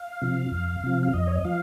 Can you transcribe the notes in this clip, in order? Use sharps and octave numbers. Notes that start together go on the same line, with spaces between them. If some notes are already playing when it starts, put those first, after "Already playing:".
Already playing: F5
C3 F3
F2
C3 F3
F5
F2 D#5
C#5
D#5
F3 F5